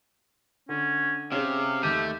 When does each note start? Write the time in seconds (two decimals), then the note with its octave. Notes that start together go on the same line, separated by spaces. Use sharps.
0.69 D3 C#4
1.32 C3 C#4 G#4 F5
1.83 D#2 A3 G4 D#7